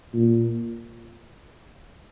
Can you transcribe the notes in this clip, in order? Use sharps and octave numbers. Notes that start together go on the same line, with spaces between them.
A#2